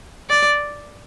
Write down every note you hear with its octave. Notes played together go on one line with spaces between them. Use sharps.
D5